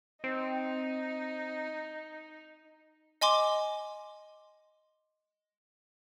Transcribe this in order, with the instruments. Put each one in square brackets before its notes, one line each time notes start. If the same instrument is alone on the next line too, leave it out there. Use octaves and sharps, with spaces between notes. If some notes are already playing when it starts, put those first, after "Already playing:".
[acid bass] C4 [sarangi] D#4
[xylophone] D#5 G#5 C6 D6